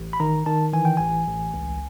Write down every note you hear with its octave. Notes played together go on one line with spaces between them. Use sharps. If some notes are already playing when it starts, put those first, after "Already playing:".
Already playing: A1
B5
D#3 A#5
D#3 A5
E3 G#5
G5
A1 G#5
A1
C#2